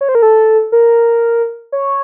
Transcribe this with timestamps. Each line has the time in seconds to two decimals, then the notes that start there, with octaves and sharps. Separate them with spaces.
0.01 C#5
0.09 C5
0.15 A#4
0.22 A4
0.72 A#4
1.72 C#5